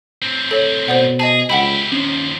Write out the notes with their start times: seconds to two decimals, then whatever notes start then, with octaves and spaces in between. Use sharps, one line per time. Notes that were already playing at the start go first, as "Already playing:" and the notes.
0.22 A2 C4
0.51 A4 C#5
0.88 B2 C5 D5 F#5
1.20 G#4 D#5 G#5 A5
1.50 C#2 E4 G4 F#5 G5 B5
1.92 D#2 F3 C#4